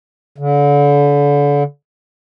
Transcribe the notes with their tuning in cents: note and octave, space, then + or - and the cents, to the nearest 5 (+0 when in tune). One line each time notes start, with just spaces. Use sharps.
D3 -35